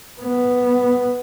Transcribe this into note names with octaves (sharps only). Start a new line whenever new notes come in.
B3